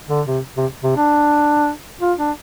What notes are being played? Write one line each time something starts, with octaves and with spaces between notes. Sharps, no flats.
D3
C3
C3
C3
D4
F4
D4